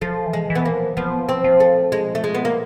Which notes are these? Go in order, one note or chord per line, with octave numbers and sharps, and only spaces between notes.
F3 A3
E3
G#3
E3
B3
A#3
F3
F3 B3
C4
F3
A3
G#3
A3
G#3
B3
A#3